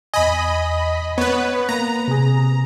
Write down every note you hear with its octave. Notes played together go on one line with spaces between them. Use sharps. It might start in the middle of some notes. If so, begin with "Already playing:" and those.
E2 D#5 G#5 B5
B3 B4 C#5
A#3 A#5
C3 G#4